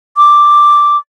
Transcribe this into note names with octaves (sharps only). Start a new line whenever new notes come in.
D6